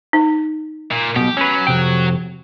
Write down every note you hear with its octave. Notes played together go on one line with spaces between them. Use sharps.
D#4
A#2
B1 B2 G4
F#3 C#4 B4
F2 C3 G5